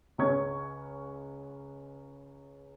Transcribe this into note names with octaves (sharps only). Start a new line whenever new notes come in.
C#2 C#3 C#4 C#6 G#6